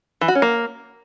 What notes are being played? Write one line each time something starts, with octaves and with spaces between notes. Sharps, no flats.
E3
F#4
C#4
A#3